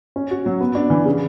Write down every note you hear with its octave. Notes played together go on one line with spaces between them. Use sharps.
C#4
F#4
F#3
B3
D4
E3
C#3